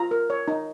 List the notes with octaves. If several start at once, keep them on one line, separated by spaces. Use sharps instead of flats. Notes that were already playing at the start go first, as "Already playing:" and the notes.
Already playing: F4 A#5
A#4
C#5
D#4